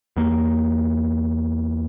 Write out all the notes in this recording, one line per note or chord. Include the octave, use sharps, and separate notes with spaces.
E2 A#3